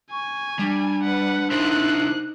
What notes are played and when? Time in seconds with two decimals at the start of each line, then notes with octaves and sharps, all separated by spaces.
0.12 G#5 C#6
0.59 G3 D4
1.03 B4 F#5
1.51 D#4 E4 A#4 C5 F#6